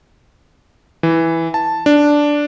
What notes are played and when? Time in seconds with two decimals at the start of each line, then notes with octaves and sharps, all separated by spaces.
1.03 E3
1.54 A5
1.86 D4